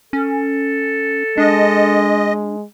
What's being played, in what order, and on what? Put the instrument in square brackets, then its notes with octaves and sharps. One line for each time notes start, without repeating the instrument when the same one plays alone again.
[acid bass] C#4 [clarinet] A4
[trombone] G#3 [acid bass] D4 [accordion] D#5